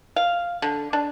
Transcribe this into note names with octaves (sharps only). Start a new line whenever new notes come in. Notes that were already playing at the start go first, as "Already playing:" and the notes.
F5
D3
D4